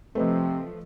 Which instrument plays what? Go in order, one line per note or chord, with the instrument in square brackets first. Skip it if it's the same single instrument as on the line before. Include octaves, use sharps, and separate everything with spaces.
[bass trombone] C3 [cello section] F3 [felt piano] A3 B4 D#5 [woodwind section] C4